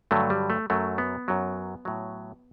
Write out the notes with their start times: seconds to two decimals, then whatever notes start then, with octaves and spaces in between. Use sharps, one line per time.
0.11 G2 D3 F#3 A3
0.30 G3
0.50 A3
0.70 F#2 F#3 A3
0.98 B3
1.28 F#2 F#3
1.85 A2 F#3